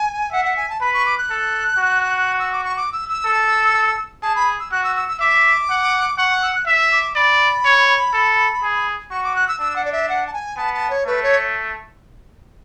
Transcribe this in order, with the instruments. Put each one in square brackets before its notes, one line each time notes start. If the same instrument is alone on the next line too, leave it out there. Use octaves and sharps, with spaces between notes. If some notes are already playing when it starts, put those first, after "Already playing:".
Already playing: [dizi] G#5
[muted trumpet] E5 [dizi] F#5
[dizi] F#5
G#5
A5
[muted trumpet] B4 [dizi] B5
[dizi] C#6
D6
F#6
[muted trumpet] A4
F#4
[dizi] E6
D6
C#6
D6
E6
E6
[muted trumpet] A4
[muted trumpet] G#4 [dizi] A5
[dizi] B5
E6
[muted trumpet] F#4 [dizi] F#6
[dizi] E6
E6
E6
[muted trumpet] E5 [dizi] D6
[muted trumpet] F#5
[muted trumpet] F#5 [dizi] C#6
[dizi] C#6
E6
F#6
[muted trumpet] E5 [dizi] E6
[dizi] D6
[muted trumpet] D5 [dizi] B5
[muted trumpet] C#5
A4
G#4
[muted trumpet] F#4 [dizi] C#6
[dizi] D6
F#6
E6
[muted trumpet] D4 [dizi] E6
[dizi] F#5
D5
E5
F#5
A5
G#5
[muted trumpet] B3 [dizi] A5
[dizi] A5
C#5
[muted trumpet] A3 [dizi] B4
[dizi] C#5